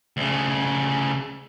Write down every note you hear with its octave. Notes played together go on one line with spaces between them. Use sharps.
D2 C#3